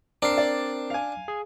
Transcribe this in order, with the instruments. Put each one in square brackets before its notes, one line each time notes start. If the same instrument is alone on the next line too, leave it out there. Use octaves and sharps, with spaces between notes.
[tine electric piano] C4 A#4 C7 [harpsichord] D4
[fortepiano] D5
F5 G#5
[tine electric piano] G#4